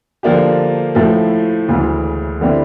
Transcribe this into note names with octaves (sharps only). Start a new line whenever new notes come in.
D3 F3 A#3 D4 G4
A2 F3 A3
D2 C#3 E3 G#3
D3 G3 C4 E4